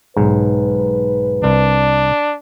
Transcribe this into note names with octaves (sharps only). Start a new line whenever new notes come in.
B1 G#2 B4
C2 D4